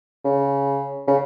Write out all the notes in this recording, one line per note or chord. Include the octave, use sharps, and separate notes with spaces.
C#3
C#3